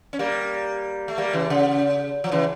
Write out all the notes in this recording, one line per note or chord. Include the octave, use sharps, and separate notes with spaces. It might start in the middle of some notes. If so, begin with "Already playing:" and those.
C#4
G3 A#3
A3
G3 A#3
C#3 E3
C#3
F3
C#3 E3